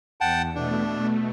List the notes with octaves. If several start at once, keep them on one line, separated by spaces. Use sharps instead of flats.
E2 F#5 G5 A5
B2 A3 D4